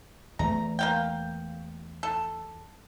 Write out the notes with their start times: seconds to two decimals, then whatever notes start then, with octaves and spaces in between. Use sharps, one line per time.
0.39 E2 A3 A#5
0.79 A#3 F5 G5
2.03 A4